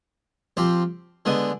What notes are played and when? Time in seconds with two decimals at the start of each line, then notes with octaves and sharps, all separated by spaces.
0.57 F3 C4 G4
1.25 D3 G#3 B3